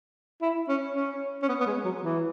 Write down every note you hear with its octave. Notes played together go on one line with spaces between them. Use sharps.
E4
C#4
C#4
C#4
B3
B3
G#3
F#3
E3